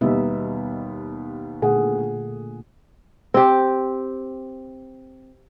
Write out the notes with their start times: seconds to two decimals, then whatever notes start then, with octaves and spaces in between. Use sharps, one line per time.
0.01 D#2 B2 G3 B3 D#4 E5
1.62 A#2 D3 A3 G#4 F#5
3.34 C4 G4